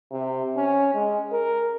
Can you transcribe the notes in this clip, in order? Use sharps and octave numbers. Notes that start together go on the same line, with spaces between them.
C3
C#4
G#3
A#4